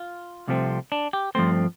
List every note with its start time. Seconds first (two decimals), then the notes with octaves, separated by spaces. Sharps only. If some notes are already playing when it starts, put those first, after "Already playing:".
Already playing: F4
0.48 C2 C3 F3 A3 C4
0.92 D4
1.13 G4
1.35 G2 F3 A3 C4 C5